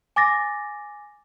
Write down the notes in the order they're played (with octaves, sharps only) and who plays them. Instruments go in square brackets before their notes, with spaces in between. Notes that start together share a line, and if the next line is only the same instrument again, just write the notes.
[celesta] G#5 D6 A6 A#6